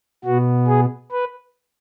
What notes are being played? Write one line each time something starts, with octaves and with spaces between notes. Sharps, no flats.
B2 B3 F#4
G#4
B4